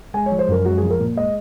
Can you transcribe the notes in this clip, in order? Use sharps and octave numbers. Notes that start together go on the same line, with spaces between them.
G#3 G#5
C#5
F3
C5
F#2 A#4
G#3 F#4
G#4
F3
A#4
A#2
G#3 D#5